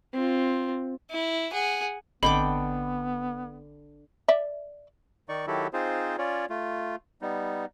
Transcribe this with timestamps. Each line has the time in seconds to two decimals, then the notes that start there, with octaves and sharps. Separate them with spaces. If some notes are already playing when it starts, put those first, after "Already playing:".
0.14 C4 F4
1.11 E4
1.52 G#4 F#5
2.23 G#1 D3 B3 C4 D#5 G5 B5 D6
4.28 D5 E5
5.29 D#3 D#4 D5 C#6
5.47 D#3 F#3 E4 F#4 G4 A4
5.73 C4 D#4 F4 G#4 C5
6.18 C#4 F4 C#5 D5
6.50 A3 F4
7.22 G3 B3 D#4